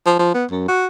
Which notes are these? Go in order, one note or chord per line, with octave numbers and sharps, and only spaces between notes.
F3
F3
B3
F#2
F#4